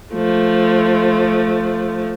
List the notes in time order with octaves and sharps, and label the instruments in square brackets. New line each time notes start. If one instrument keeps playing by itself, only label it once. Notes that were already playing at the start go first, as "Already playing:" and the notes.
[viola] F3 A3